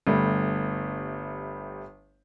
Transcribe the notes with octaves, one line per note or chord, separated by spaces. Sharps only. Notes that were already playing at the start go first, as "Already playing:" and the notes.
G1 G3 A3